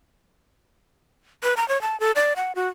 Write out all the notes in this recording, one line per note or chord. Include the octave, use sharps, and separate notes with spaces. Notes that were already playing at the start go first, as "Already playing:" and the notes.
B4
A#5
C#5
A5
A4
D5
F#5
F#4